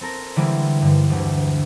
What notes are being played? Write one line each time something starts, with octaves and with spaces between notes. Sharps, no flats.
C4 A4 A#4 A#5
D3 E3 G3 G#3 C4
G2 D3
E1 D2